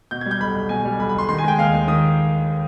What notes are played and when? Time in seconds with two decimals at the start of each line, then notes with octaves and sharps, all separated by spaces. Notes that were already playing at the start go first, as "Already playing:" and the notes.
0.11 B2 G6
0.21 G#6
0.26 G3
0.31 G6
0.41 B1 B5
0.55 B1
0.69 B2 G#5
0.85 G3
0.99 B1 B5
1.09 B5
1.14 B1 C6
1.29 D#3 C6
1.38 G#5
1.44 G#3 G5
1.58 D#2 F5
1.73 D#2
1.87 D#3 D#6